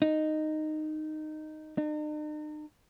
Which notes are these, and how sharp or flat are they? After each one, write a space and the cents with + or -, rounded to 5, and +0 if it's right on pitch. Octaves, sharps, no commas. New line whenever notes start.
D#4 -10
D#4 -45